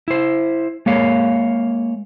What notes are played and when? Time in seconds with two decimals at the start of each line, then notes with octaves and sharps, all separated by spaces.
0.08 E4 C5
0.86 G#3 A#3 C#5 F5